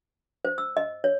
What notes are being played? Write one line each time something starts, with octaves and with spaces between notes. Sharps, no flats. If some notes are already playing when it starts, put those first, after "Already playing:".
C5
E6
D#5
C#5